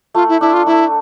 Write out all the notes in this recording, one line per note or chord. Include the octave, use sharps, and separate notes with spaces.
A3 F4
E4
D4 E4 A4
F4
A3 E4